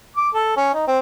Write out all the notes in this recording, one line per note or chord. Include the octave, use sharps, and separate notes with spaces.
D6
A4
C#4
D#4
C4